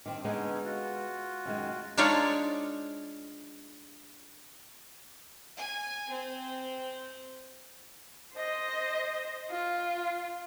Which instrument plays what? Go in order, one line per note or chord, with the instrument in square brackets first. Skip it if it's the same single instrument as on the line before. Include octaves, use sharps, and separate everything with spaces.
[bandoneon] G2 D6 [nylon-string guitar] D#3 C4
[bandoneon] D3 C#4 D#4 [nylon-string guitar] G#3 B3 G#4
[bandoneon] F4 F#4
[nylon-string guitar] F#2 D#3 G#3
[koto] G#3 D4 D#4 F4 C#5 D5
[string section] G#5
C4
[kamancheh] C5 D#5
F4